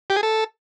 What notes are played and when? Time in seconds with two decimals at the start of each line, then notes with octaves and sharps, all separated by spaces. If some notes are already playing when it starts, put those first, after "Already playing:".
0.10 G4
0.16 G#4
0.23 A4